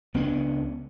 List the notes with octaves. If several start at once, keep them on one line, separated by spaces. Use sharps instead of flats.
C#2 B3 C#4 D4